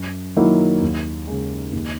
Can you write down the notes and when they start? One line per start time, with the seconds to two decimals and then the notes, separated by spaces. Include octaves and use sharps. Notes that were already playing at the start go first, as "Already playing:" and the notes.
Already playing: F#2
0.36 D#3 F#3 A#3 E4
0.82 D#2
1.27 C#3 G#3
1.73 D#2